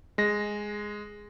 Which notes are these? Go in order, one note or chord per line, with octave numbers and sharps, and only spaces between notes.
G#3 A#6